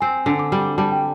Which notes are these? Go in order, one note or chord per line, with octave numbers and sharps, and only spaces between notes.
C4 G#5
D3
D6
G3
D6
G3 A5
G5